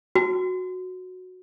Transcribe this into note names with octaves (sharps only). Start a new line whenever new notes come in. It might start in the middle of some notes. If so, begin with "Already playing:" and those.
F#4